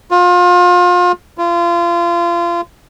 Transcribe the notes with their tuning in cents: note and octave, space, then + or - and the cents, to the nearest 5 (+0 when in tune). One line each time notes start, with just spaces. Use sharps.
F4 +30
F4 -30